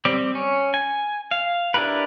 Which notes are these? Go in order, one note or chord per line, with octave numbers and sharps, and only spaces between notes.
G3 C4 G4
C#4
G#5
F5
D4 E4 G4 A#4 B4